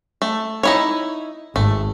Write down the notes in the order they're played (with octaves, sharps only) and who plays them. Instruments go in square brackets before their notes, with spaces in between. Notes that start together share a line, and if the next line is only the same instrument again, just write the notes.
[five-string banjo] A3
D#4 E4 C#5
[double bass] G#1 [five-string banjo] A3